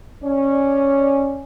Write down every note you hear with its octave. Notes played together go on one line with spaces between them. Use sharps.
C#4 D5